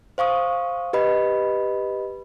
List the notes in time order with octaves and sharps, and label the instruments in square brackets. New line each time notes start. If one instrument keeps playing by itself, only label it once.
[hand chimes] C5 F5 C#6 D#6
G4 B4 D#5 B5